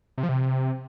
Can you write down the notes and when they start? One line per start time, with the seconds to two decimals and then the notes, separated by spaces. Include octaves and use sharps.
0.18 C3
0.23 F3
0.29 C3